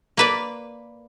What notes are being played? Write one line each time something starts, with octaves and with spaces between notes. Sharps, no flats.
A#3 B4 D5